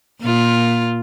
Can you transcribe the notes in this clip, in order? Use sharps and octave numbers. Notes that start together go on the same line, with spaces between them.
A#2 F4